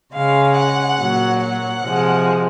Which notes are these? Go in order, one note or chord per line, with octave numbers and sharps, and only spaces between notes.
C#3 G#3 F5
F#5
A#2 F#3
F#5
C3 F3 G#3